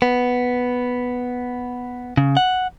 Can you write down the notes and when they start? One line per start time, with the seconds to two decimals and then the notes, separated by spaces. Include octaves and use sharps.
0.02 B3
2.17 C#3
2.37 F#5